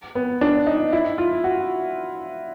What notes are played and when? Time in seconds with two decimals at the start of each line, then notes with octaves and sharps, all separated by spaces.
0.15 B3
0.41 D4
0.67 D#4
0.93 E4
1.18 F4
1.44 F#4